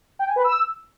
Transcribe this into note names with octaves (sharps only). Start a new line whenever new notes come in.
G5
G#5
B4
E6